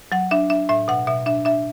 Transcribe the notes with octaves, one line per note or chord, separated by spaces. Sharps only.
F#3 F#5
D4 E5
D4 E5
A2 E5
B2 F#5
B2 E5
D4 E5
D4 E5